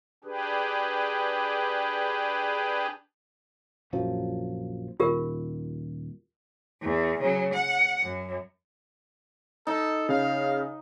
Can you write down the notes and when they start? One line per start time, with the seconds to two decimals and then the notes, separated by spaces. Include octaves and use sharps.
0.24 D4 G4 G#4 B4
3.93 A#1 F#2 F3
5.00 D#1 F4 G4 A#4
6.82 E2
7.21 C#3 F#3
7.54 F#5
8.02 F#2
9.67 D#4 A4
10.09 C#3 F5